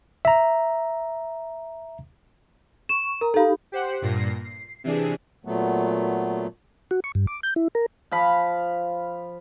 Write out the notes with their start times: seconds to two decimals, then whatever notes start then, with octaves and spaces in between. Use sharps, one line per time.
0.25 E5 A#5
2.89 C#6 E7
3.21 A#4 A#5
3.34 D#4 G4 A4 F5 B5
3.72 G4 C5 F#5
4.02 G2 A#2 A#6 C7
4.45 C7
4.84 C3 E3 D4 G#4
5.45 A#2 F#3 A3 B3
6.91 F#4
7.04 C#6
7.15 G2
7.27 D6
7.43 G6
7.56 E4
7.75 A#4
8.11 F3 F5 B5